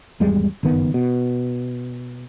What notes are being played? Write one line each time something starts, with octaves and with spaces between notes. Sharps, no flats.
G#1 E2 G3 G#3
F#1 G2 D#3 B3
B2